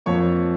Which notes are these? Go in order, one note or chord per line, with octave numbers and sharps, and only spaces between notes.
F2 F3 A#3 C#5 C#6